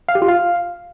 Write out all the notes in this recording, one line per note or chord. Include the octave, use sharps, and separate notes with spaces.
F5
G4
F4
F5